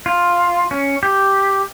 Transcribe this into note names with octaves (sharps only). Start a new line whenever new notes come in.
F4
C#4
G4